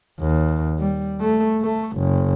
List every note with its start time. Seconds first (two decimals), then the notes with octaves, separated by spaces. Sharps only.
0.21 D#2
0.80 G3
1.21 A3
1.62 A3
1.98 F#1